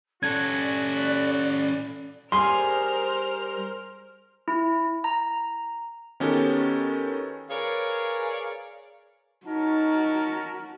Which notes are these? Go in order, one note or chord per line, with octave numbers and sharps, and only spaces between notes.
C#4 F#4 A4 D5 G#6
G3 G#4 A#4 C5 C6 F6
E4
A#5
D#3 B3 C#4 F#4 G4 A4
G#4 A#4 B4 C#5 D5 F5
C#4 D#4 F#4 A#4 A5